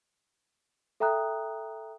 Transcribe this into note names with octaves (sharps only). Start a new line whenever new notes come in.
A4 E5 G5 A#5 D#6 F#6